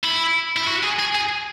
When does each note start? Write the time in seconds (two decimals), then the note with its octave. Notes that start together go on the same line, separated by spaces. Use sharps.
0.05 E4
0.56 E4
0.67 F#4
0.83 G#4
0.99 G#4
1.15 G#4